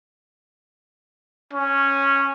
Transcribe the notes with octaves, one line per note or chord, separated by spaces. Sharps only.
C#4